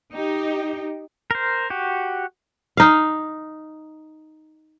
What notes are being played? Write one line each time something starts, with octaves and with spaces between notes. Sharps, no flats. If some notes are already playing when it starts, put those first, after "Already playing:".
D#4 G4
A#4 C5
F#4 G4
D#4 F5